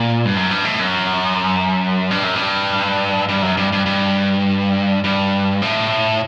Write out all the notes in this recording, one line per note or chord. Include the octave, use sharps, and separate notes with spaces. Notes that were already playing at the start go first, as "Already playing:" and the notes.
Already playing: A#2
G2
F#2
G2
A2
F#2
G2
F#2
G2
G2
F#2
G2
G2
G2
G2
A2